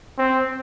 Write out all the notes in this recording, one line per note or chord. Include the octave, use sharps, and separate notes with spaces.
C4